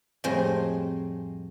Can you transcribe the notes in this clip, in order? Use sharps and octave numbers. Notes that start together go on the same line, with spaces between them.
F2 A2 G3 G#4 C5 D#5